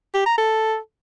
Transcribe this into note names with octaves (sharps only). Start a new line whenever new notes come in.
G4
A#5
A4